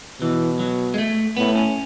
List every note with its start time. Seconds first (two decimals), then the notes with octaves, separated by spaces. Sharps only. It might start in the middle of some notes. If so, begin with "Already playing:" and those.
0.21 B2 E3
0.60 F#3
0.94 G#3
0.98 A3
1.37 A2 B3
1.55 C#4